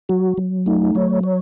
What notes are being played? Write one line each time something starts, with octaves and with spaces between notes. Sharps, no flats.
F#3 F#4
F#3
A3 D#4
F#3 C#5
C#5